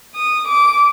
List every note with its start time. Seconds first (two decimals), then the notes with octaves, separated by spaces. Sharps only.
0.16 D#6
0.49 D6